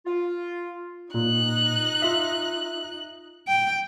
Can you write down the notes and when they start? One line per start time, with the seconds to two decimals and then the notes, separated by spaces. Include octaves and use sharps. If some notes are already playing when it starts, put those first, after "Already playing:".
0.06 F4
1.14 A#2 D#4 F#6
2.02 F4 E5
3.48 G5